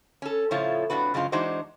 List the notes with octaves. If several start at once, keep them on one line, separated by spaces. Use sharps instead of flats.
C#4 A4
A2 C#3 F3 A3 F4 C#5
F2 A2 D4 F#4 B4
F#2 C#3 F3 G#3 F4
E3 G#3 D4 D#4 F#4 C5